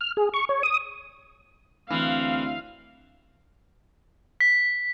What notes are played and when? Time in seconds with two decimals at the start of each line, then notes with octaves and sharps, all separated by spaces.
0.01 F6
0.17 G#4
0.34 C#6
0.49 C#5
0.63 D#6
1.90 D2 E3 C4 F5
4.41 B6